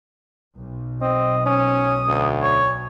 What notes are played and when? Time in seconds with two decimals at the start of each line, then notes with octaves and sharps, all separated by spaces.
0.56 B1
1.02 C4 D#5
1.46 C#4 D#6
2.08 D2
2.42 C#5